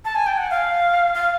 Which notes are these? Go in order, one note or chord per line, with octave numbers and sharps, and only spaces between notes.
A5
G#5
G5
F#5
F5
F5